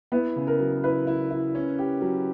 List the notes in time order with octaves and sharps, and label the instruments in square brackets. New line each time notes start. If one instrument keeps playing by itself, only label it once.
[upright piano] B3 [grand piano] E4
[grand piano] C#3
[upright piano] A#4
[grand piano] F#3
[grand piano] E4 [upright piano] B4
[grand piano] E4
E4
C#4
G4
F#3